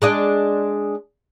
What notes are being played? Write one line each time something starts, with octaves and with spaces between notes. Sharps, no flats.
G#3 D4 D#5